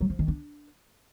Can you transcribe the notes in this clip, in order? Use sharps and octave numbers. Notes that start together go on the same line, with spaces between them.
F#3
F3
D#3
D4